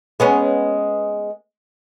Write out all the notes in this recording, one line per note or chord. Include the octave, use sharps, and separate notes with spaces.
G#3 B3 C#4